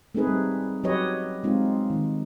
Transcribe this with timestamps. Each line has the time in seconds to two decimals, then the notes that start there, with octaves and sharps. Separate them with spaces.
0.15 A3 C4 D#4 G#4 B4
0.27 G3
0.84 F#3 G4 B4 C#5 D#5
1.44 G#3 C4 D#4 F4
1.90 D#3